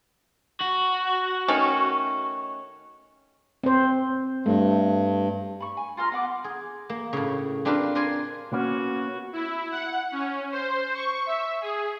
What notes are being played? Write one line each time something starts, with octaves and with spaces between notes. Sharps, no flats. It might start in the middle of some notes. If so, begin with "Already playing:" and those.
F#4
D#3 A3 C#4
C4 C5
G2 A3
B5 C#6
G#5
F4 A#4 C6 F6
B3 F#5 D6
G#4
A#3
A2 C#3
C4 D4 F4 G4 A#4 B4
A#4 C5 D5 G#5 C6
A#3 B3 C#4 F#4
E4
F#5
C#4
C5
C#6
E5
G#4